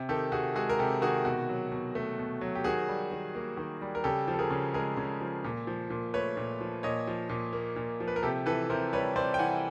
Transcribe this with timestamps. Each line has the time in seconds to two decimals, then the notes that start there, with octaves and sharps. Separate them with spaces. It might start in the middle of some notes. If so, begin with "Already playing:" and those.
Already playing: C3
0.09 D#3 G4 A4
0.32 C3 F#4 G#4
0.55 G#3 F#4 G#4
0.70 A#4
0.79 C3 G4 A4
1.02 D#3 F#4 G#4
1.25 B2 F#4
1.49 F#3
1.72 B2
1.95 A3
2.19 B2
2.41 F#3
2.55 G4
2.64 D#3 F#4 G#4
2.88 G3
3.11 D#3
3.35 A#3
3.57 D#3
3.82 G3
3.95 A#4
4.04 C#3 G4 A4
4.28 F3
4.34 A4
4.39 G#4 A#4
4.51 C#3
4.74 G#3 G#4 A#4
4.97 C#3
5.21 F3
5.44 A#2
5.67 F3
5.90 A#2
6.14 A3 B4 C#5
6.37 A#2
6.61 F3
6.83 A#2 C#5 D#5
7.07 F3
7.29 A#2
7.53 A#3
7.76 A#2
8.00 F3
8.08 B4
8.16 A#4
8.23 C3 G4 A4
8.46 E3 A4 B4
8.69 C3 A#4 C5
8.93 G3 B4 C#5
9.16 C3 C5 D5
9.34 G5
9.39 E3 F#5 G#5